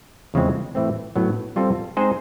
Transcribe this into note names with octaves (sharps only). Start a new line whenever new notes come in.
E2 C#3 F3 G#3 C4
A2 E3 A3 C4
A2 F#3 B3
G3 C4 F4 A4 C5
G#3 C4 D#4 G#4 C5